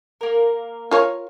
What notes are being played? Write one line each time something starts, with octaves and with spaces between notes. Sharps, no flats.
A#3 A#4
F4 A#4 C#5